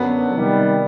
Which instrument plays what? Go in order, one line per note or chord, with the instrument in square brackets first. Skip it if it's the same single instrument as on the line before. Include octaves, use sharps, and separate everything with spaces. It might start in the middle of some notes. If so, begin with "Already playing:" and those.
Already playing: [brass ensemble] F#2 D3 F#3 [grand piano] B3
[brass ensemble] C3 D#3 G3